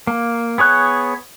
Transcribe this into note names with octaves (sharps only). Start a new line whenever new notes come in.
A#3
B3 G#4 C#5 F#6